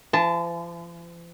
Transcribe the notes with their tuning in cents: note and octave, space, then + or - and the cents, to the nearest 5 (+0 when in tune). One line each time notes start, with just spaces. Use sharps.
F3 -45 A5 +0